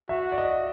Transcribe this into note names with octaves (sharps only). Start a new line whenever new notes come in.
F#4 E5
D5
D#5